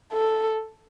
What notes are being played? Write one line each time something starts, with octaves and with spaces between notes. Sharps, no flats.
A4